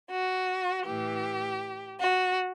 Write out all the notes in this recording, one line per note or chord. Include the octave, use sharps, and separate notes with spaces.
F#4
A2 E3 G4
F#4